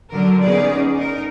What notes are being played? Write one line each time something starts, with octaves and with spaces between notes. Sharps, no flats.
D3 F#3 A#4
B3 C#4 D#4 G#4 D5
D#4 A#4